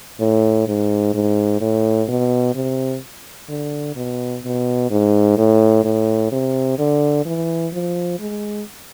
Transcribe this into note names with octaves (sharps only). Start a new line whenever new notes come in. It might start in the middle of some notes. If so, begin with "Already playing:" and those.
A2
G#2
G#2
A2
B2
C3
D3
B2
B2
G#2
A2
A2
C3
D3
E3
F3
G#3